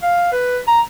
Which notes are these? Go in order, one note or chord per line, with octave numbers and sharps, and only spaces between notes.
F5
B4
A#5